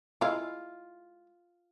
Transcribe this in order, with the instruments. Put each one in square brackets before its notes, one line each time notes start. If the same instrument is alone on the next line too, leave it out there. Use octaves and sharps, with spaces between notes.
[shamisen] G#3 E4 F5 [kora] F4